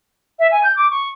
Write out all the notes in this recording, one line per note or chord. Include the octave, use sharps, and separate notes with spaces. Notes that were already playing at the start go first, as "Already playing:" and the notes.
E5
G#5
G6
D6
C#6